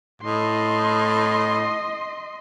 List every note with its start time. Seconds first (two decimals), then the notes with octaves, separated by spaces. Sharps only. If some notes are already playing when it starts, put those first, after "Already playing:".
0.22 A2 D#5 C6